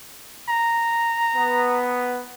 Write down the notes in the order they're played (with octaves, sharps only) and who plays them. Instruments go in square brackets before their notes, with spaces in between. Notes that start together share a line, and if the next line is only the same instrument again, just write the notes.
[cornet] A#5
[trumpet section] B3